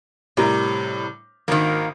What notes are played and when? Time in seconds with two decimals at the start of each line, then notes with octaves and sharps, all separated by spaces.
0.37 A2 C3 G3 A#4
1.48 G#1 D#3 A#3